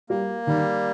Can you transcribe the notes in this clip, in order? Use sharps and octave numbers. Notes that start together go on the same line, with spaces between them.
G3 A#3
D#3 G3